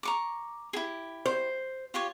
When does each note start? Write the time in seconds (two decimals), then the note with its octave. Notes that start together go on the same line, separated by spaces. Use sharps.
0.03 A#5 C#6 D6
0.73 E4 G4 G#4
1.26 C5
1.94 F4 G4 C#5